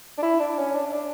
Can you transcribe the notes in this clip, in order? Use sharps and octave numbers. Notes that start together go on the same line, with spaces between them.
D4
E4
D4
C#4
D4
D4